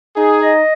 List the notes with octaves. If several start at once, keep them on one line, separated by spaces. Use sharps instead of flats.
D#4 G#4
D#5